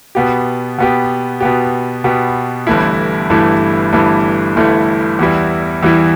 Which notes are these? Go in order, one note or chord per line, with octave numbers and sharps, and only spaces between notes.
B2 B3 G4
B2 B3 G4
B2 B3 G4
B2 B3 G4
G1 G2 E3 A3 E4
G1 G2 E3 A3 E4
G1 G2 E3 A3 E4
G1 G2 E3 A3 E4
E2 E3 G3 E4
E2 E3 G3 E4